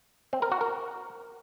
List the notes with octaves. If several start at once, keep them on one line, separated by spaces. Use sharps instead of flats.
C4
A#4
F#4
A#4